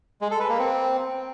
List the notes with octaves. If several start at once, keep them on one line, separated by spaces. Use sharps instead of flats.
G#3
A4
B4
A#3
C4